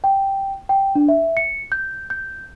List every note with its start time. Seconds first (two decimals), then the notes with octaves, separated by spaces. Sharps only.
0.04 G5
0.69 G5
0.95 D4
1.08 E5
1.37 C#7
1.72 G6
2.10 G6